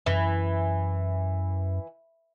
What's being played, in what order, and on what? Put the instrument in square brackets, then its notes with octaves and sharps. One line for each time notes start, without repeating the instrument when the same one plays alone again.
[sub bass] F#2 [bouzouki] E3